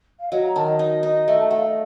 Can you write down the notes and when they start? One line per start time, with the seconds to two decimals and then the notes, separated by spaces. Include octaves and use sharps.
0.20 F5
0.31 F#3 D#5
0.43 A#5
0.55 D#3 A5
0.67 D#5
0.79 D#4
1.03 D#4
1.28 A3
1.40 A5
1.50 A3 F#5
1.57 F5
1.67 D#5